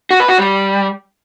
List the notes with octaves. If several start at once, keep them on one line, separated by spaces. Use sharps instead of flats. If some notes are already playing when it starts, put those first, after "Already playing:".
F#4
B4
F#4
G3